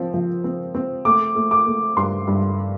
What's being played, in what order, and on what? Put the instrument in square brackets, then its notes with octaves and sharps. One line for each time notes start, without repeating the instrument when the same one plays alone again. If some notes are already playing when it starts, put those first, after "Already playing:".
Already playing: [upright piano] F3 C4
F3
C4
C4
A3 D6
A3
D6
A3
G2 C6
G2